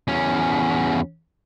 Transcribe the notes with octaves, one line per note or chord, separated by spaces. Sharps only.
E2 C#4